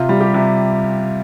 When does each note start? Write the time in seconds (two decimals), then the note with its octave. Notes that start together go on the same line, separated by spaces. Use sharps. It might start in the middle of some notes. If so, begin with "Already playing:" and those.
Already playing: C3 F4
0.09 G3
0.21 G4
0.34 C3